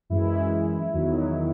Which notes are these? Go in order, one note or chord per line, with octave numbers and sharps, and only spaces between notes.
F#2 E3 G#3 E4
E2 D#3 F#3